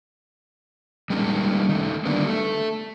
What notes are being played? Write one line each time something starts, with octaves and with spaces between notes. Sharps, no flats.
G3 G#3 A#3 C#4 D#4
D#3 A3
D3 G3 A#3 B3 D4
A3 A4